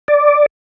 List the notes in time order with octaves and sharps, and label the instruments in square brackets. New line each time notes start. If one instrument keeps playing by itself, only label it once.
[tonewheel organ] D5